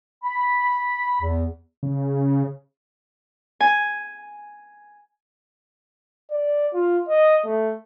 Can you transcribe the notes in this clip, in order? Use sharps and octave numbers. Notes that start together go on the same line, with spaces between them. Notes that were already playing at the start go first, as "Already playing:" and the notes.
B5
E2
C#3
G#5
D5
F4
D#5
A3